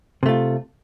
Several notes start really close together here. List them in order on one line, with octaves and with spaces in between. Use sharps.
C3 A3 F4